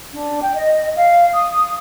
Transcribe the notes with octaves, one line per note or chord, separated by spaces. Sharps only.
D4
G5
D#5
F5
D#6